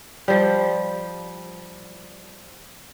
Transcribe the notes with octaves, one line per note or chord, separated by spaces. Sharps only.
F3 G3